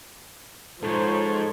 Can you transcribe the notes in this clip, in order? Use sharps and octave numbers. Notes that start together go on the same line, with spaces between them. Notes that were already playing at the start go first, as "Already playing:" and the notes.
G#2 F3 A4 C5 C#5